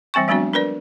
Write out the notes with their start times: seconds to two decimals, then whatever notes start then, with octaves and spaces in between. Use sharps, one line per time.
0.14 E3 G3 C4 G5 C#6
0.28 F#3 G#3 B3 C4 D4 F#4
0.53 D4 A#4 B4 D5